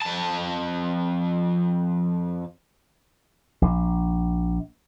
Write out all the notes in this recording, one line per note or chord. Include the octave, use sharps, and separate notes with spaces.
F2 A5
A#1